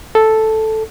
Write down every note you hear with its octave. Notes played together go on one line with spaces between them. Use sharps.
A4